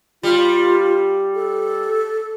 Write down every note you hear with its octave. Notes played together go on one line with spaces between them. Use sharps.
G3 F4
A4